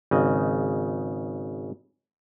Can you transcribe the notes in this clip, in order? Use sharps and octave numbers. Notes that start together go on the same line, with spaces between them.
G#1 C#3 D#5